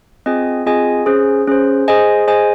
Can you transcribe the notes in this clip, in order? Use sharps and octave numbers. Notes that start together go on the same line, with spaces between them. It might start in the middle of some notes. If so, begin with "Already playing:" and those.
C4 F4 G#4 D#5 G#5
C4 F4 G#4 D#5 G#5
C#4 G#4 C5
C#4 G#4 C5
G#4 C5 D#5 G#5
G#4 C5 D#5 G#5